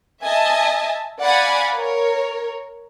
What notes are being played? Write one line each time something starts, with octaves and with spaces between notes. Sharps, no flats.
D#5 E5 G#5 A5
D5 F5 F#5 G#5 B5
A#4 C#5